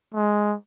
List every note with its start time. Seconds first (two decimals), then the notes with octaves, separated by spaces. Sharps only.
0.14 G#3